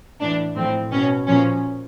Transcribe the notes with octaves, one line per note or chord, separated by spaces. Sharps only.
A2 E3 D4
A2 F3 C4
B2 C#4
A#2 F3 C#4